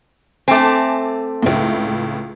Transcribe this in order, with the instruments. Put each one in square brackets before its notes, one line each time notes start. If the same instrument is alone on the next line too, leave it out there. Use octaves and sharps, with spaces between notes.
[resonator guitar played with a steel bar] A3 C4 [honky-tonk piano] G#5 A5 D6
[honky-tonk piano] C#2 A2